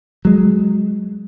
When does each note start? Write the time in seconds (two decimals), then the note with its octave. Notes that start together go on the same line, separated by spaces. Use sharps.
0.25 F#3 G#3